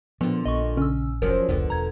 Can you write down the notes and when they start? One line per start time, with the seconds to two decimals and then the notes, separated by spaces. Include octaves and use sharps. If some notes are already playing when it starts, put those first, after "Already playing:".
0.21 A#2 D3 F3 B3
0.45 A#1 D#5 C#6
0.77 C#3 C#4 E6
1.22 F1 F3 F#3 C#4 A#4
1.49 F1 C#2 D3 B3
1.70 E1 A#5 G#6